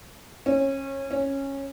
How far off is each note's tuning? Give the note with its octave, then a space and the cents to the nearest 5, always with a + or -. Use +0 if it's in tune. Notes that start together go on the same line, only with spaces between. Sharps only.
C#4 -25
C#4 -15